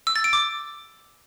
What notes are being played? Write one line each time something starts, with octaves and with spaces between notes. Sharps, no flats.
E6
A6
D7
D6